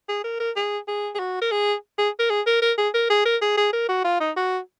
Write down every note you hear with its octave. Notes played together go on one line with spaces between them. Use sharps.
G#4
A#4
A#4
G#4
G#4
G#4
F#4
A#4
G#4
G#4
A#4
G#4
A#4
A#4
G#4
A#4
G#4
A#4
G#4
G#4
A#4
F#4
F4
D#4
F#4